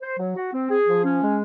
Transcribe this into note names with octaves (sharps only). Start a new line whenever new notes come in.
C5
F#3
F#4
C4
G#4
F3
C#4
G#3